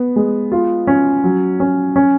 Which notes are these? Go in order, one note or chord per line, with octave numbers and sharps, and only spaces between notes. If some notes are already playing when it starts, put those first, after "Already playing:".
Already playing: B3
G#3
F4
C#4
F#3
C#4
C#4